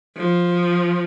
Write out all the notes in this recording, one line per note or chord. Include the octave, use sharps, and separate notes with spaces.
F3